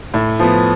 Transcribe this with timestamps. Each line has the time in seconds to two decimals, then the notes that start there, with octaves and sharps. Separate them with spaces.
0.14 A2
0.39 F3 B3